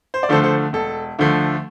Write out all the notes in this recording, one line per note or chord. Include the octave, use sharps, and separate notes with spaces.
C5
D5
D2 D3 F3 A3 A4 C5
A4 C5
E1 A4
D2 D3 F3 A3